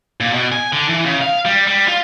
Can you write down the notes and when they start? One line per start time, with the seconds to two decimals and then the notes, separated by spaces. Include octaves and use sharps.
0.20 A#2
0.33 B2
0.52 G#5
0.73 D3
0.89 E3
1.05 C#3
1.21 F5
1.45 G3
1.67 G3
1.88 F4